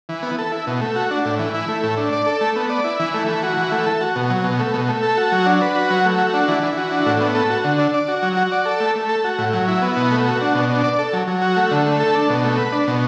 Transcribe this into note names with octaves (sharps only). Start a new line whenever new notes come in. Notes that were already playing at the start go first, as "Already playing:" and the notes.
E3
B3
A4
E4
B2
A3
F#4
D4
A2
E3
E4
A3
A2
D4
D5
A4
A3
B3
D5
E4
E3
A3
E3
F#4
E3
A3
A4
F#4
B2
F#3
B2
A3
B2
A3
A4
F#4
F#3
D4
B4
F#4
F#3
A3
F#4
D4
E3
E3
F#4
D4
A2
B3
A4
F#4
D3
D4
D5
F#4
F#3
F#4
D5
A4
A3
A3
A4
F#4
A2
F#3
E4
B3
B2
A3
F#4
D4
B2
D4
D5
A4
F#3
F#3
F#4
A3
D3
A3
A4
D4
B2
A3
B4
D4
B2